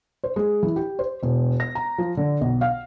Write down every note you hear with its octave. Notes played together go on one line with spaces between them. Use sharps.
C5
G#3
E3
G4
C5
E1
A#6
A#5
F3
D3
B1
F5